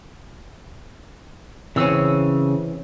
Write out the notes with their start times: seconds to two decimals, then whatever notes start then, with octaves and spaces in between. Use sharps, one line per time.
1.76 C#3 E3 C4 C#4 E6